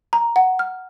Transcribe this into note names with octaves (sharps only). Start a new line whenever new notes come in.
A#5
F#5
F6